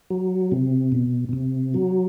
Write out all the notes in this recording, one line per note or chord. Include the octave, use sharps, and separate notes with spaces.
F#3
C3
B2
B2
C3
F#3